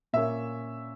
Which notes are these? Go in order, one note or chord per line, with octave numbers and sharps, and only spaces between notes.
A#2 A#3 C#4 E5